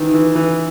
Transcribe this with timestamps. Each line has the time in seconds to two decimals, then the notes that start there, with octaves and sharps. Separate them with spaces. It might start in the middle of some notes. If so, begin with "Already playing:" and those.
Already playing: D#3 E3
0.14 E3
0.35 E3